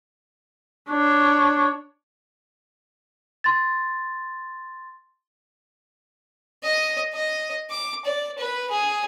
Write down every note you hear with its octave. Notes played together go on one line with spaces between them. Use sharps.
D4 C#5
C6 A6
D#5
D#5
D6
D5
B4
G#4